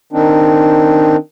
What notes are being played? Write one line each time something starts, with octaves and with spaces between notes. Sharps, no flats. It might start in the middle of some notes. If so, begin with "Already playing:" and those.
D#3 C4 D4 D#4